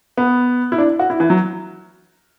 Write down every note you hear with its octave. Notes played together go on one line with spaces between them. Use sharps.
B3
E4
D4
F#4
E4
E3
F#3